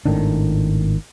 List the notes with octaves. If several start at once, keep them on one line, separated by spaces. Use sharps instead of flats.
G#1 A2 D#3 D4